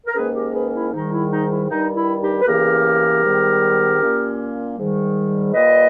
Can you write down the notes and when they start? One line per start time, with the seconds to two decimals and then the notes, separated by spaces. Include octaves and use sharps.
0.06 A#4
0.15 G#2 D#3 A#3 C#4 G#4 B4
0.34 G4 A#4
0.54 G#4 B4
0.73 E4
0.92 G#2 D#3 G3 D#4
1.11 E4
1.31 D#4
1.50 E4
1.69 G2 D#3 G3 D#4
1.95 E4
2.20 D#4 G4
2.41 B4
2.46 E2 C#3 E3 A#3 C#4 G4 A#4
3.23 G#2 D#3 G3 B3
4.00 A#2 A#3 C#4
4.77 G#2 D#3 G3
5.53 A#2 G3 A#3 B4 D#5